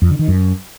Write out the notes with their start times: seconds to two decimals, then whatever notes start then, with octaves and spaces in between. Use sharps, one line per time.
0.02 F2
0.10 D3
0.19 D#3
0.28 F#2